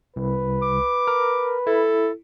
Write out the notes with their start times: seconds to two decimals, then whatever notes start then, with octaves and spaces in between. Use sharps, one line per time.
0.16 C2 B4
0.62 D6
1.07 A#4
1.67 E4 A4